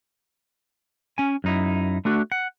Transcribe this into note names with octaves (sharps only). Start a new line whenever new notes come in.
C#4 G#5
F#2 D#4 E4
A3 D4 F#4
F#5